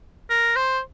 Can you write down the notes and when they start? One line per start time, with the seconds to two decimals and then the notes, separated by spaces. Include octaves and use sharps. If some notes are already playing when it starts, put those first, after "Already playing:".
0.30 A#4
0.56 C5